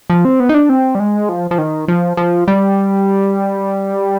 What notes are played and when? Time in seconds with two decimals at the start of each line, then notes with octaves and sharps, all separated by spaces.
0.10 F3
0.25 C4
0.40 B3
0.49 D#4
0.54 D4
0.69 C4
0.95 G3
1.00 G#3
1.29 F3
1.51 F3
1.58 D#3
1.88 F3
2.17 F3
2.48 G3